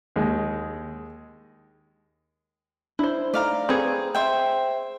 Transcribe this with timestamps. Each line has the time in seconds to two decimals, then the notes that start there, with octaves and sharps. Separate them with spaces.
0.16 D#2 G#3
2.99 D4 E4 C5
3.34 A3 D#4 D5 F5 A#5
3.69 C4 G#4 A4 B4 C#6
4.15 C5 E5 G5